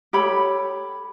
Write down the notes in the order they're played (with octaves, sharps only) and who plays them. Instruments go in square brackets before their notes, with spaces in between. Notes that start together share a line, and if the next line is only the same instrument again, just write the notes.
[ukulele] G4 A4 C#5 B5